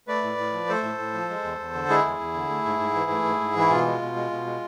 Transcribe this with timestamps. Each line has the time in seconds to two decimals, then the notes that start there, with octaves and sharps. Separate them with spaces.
0.07 A3 B4 D5
0.23 A2
0.38 A2
0.53 F3
0.69 A3 A4 C5
0.83 A2
0.98 A2
1.14 F3
1.29 G#3
1.44 E2
1.60 E2
1.74 D3
1.89 G#3 E4 G#4
2.05 E2
2.20 E2
2.34 D3
2.49 A3
2.65 G#2
2.80 G#2
2.95 E3
3.11 A3
3.25 G#2
3.40 G#2
3.56 E3 E4
3.70 B2 F4
3.87 G#3
4.02 B2
4.16 G#3
4.31 B2
4.46 G#3